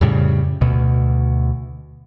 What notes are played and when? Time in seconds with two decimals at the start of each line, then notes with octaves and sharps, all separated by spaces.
0.01 F2 A2 C#3 G3
0.61 D2 B2